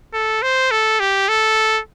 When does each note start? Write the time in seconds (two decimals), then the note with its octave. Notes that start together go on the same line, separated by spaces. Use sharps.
0.13 A4
0.42 C5
0.71 A4
1.00 G4
1.29 A4